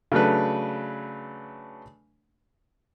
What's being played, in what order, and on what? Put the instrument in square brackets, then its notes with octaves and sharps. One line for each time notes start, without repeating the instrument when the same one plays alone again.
[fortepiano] C#3 F#3 A3 D4 B4